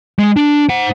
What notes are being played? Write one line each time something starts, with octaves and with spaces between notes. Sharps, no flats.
G#3
D4
C5 F#5